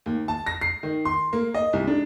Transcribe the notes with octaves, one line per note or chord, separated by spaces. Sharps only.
D#2
A5
A#6
C7
D#3
C6
A#3
D#5
C2
D4